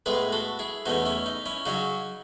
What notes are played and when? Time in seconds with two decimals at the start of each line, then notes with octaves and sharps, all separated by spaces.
0.06 A2 G#3 B3 G#4 B4
0.33 F#4 A4
0.59 E4 G#4
0.86 E2 B2 A3 C#4 D#4 F#4
1.06 C#4 E4
1.26 D#4
1.46 C#4 E4
1.66 C#3 F#3 C#4 D#4 F#4